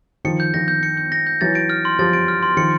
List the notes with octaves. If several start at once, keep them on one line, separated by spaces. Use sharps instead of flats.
D#3 F3 C#7
G6
D#3 F3 A#6
G6
C#7
G6
A#6
G6
E3 F#3 A6
D7
F6
C6
F3 G3 A6
D7
F6
C6
D#3 F3 C#7